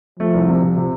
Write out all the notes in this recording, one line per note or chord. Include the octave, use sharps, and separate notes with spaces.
F3 A3
C2
C3
C3
C3